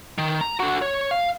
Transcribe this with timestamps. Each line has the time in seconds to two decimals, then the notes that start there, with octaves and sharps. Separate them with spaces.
0.18 D#3
0.41 A#5
0.60 D3 F#4
0.82 C#5
1.11 F5